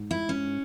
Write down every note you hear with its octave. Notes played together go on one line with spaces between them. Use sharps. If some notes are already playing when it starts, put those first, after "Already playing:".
Already playing: G#2
E4
C#4